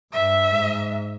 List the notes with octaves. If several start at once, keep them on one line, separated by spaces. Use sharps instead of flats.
G2 E5
G#2